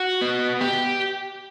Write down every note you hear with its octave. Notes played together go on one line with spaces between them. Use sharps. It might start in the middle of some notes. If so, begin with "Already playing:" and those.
Already playing: F#4
B3
G4